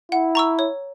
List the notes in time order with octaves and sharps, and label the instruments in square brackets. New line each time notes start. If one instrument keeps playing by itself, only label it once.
[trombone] E4 [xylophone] F#5
[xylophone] A#5 C#6 E6
C#5